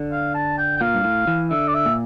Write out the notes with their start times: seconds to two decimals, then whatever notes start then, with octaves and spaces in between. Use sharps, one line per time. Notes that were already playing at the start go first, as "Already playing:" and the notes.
Already playing: D3
0.12 F5
0.35 A5
0.58 G5
0.77 G5
0.81 A#2 F5
0.95 G2
1.04 A2
1.27 E3
1.50 D3 E5
1.67 D5
1.74 E5
1.86 A#2